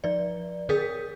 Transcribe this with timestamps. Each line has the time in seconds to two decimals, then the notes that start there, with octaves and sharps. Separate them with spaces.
0.04 F3 D5
0.69 D3 G#4 A#4 D#6 G6 B6